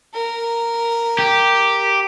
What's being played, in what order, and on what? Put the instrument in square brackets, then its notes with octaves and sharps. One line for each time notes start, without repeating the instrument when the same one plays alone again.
[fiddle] A#4
[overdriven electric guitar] G4